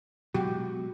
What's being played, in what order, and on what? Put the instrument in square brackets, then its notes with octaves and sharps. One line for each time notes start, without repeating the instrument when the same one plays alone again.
[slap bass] B2 F#3 G#3 [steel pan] F#4 G4